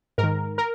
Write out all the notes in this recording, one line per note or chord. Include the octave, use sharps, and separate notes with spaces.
G#2 A#4
D#3
A#4